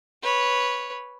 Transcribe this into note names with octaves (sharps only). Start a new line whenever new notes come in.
B4 C#5